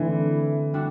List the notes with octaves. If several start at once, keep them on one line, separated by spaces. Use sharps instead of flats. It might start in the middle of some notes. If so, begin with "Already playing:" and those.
Already playing: D3 E3 A3 C4 E4
G3 D4 F#4